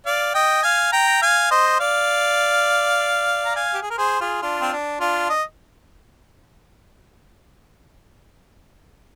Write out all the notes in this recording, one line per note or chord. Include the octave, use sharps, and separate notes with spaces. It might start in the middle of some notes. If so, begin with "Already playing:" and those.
D5 F5
D#5 G5
F5 G#5
G5 A#5
F5 G#5
C5 D#5
D5 F5
A#5
F5 G#5
G4
G#4
A#4
G#4 C5
F4 G#4
D4 F4
C4
D4
D4 F4
D#5